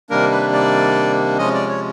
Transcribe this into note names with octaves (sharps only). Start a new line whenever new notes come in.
C3 D#3 G3 A#3 D4 A#4
B4
D5
C3 F3 G#3 C#4 D#5
D5
C#5